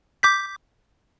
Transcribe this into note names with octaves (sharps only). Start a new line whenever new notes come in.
D6 G6 B6